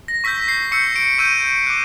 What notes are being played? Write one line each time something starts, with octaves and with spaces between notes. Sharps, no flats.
A#6
C#6 E6 G6 B6
C7
C#6 E6 G6 C#7
D7
C#6 E6 G6 D#7
D6 F#6